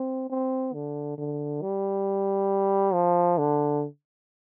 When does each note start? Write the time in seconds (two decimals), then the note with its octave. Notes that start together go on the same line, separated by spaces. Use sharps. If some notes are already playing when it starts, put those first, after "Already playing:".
Already playing: C4
0.30 C4
0.74 D3
1.18 D3
1.62 G3
2.94 F3
3.38 D3